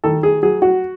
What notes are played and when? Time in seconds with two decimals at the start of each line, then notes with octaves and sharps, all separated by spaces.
0.04 D#3 A4
0.23 G#4
0.43 F#3 G#4
0.62 F#4